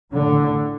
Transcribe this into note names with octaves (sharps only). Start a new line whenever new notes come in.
A2 D3